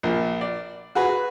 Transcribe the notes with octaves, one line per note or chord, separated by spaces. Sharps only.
A#1 F3
D5
F#4 G#4 B4